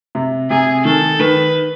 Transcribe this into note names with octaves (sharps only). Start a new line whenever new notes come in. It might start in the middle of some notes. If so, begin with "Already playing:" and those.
C3
C3 G#4
D#3 A4
D#3 B4